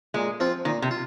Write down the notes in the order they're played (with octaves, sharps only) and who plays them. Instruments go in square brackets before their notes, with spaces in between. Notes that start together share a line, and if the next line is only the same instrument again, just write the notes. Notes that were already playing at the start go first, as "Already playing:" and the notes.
[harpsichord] A#2 [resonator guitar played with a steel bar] G#3
[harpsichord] F3 C4 F4
[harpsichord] A#2 [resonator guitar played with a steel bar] D#3
[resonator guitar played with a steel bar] C3
[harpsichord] F4